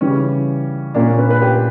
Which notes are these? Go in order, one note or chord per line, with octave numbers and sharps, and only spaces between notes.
C#3 E3 G3 C#4
A#2 A#3 C#4 D4
C#4
B4
B4
G4